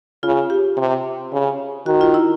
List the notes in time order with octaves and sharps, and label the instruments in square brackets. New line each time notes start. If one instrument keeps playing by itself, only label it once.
[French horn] C#3 [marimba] F4
[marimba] G4
[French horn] C3
C#3
[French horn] D#3 [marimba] F#4
[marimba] F4
E4